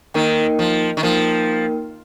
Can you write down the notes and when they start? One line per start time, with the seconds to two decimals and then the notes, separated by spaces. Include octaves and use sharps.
0.14 D#3 A#3 D#4 A#4 G5
0.59 F3
0.97 D#3
1.03 F3 A#3 D#4 A#4 G5